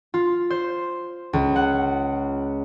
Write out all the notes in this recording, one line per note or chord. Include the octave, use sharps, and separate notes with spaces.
F4
C5
C#2
F#5